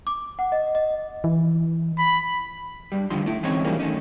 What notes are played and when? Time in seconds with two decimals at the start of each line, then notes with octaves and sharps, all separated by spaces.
0.07 D6
0.39 F#5
0.52 D#5
0.75 D#5
1.24 E3
1.98 B5
2.92 G2 G3
3.10 G2 D3 D#3 F3 C6
3.26 A3 E4
3.43 E3 G#3 C4 C#4 D#4 C#5
3.65 A2 C#3 E3 F3 G3 A#3
3.80 F#2 D#3 A3 C#4 D#4